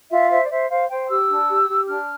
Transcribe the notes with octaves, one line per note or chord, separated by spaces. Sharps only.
F4 E5
C5 E5
D5
C5 E5
C5 F5
C5 G5
G4 E6
D4
G4
G4
D4 F6